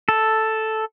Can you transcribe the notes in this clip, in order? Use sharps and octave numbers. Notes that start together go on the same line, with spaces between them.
A4